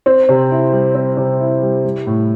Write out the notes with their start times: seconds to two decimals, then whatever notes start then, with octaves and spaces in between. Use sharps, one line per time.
0.06 C4
0.29 C3
0.51 E4
0.73 G3
0.95 C4
1.17 C3
1.40 E4
1.62 G3
1.85 G3
2.07 A2